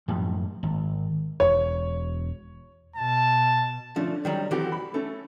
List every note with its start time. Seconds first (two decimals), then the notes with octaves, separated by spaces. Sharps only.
0.08 F#2 A2 F3 G3
0.63 G#1
1.40 E1 C#5
2.96 B2 A5
3.96 D3 F3 A3 C#4 D4
4.25 D#3 F#3 G3
4.51 E3 C4 F#4 G4 A4
4.72 B5
4.94 A3 C#4 A4